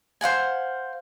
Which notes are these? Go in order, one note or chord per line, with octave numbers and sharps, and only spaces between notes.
C5 F5 F#5 G#5